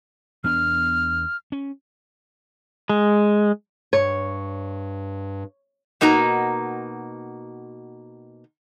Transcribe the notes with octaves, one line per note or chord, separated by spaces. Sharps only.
E2 B3 D4 F6
C#4
G#3
G2 C#5
B2 A#3 D#4 F#4 A#5